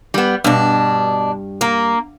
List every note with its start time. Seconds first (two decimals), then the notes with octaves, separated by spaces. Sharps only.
0.14 G3 B3
0.44 G2 B2 D4
1.61 A#3